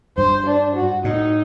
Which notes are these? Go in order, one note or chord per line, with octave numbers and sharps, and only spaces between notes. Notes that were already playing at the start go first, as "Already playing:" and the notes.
G2 C5
D4
F#4
A2 D#4